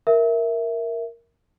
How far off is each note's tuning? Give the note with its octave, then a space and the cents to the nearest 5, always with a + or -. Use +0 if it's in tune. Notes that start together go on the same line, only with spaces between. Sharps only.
A#4 +0 E5 +0